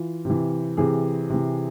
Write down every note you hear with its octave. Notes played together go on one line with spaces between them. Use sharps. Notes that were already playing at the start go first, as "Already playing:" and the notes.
Already playing: E3 F4
C3 E3
C3 E3 G#4
C3 E3